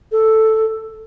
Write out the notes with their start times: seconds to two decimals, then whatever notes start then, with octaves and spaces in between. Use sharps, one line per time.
0.12 A4